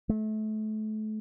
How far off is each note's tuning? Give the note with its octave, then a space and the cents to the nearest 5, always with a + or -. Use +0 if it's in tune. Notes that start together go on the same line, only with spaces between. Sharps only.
A3 -30